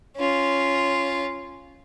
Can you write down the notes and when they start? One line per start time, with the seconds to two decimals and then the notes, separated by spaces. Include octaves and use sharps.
0.16 C#4 F4